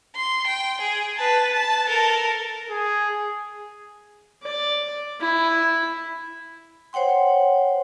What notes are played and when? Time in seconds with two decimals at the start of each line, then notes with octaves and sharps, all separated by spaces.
0.15 C6
0.46 G5
0.81 G#4
1.17 B4 A5
1.52 A5
1.85 A4 A#4
2.70 G#4
4.43 D5
5.21 E4
6.93 C5 C#5 F#5 G5 C6